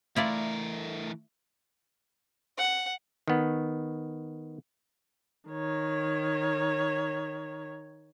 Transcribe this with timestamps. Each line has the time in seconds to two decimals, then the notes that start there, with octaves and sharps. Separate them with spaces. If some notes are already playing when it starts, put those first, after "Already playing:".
0.16 E3 A3 E4 F4 A#4 D5
2.58 F#5
3.28 D#3 B3
5.50 D#3 C#5